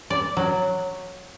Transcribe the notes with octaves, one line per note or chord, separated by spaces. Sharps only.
D5
F#3